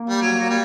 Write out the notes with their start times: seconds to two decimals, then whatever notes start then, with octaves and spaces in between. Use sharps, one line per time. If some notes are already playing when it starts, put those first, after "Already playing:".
Already playing: A#3
0.09 G3
0.22 F#3
0.39 F#3
0.50 G3